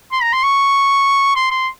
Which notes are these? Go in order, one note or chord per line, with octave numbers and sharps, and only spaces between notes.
C6
A#5
C6
C#6
C6
C6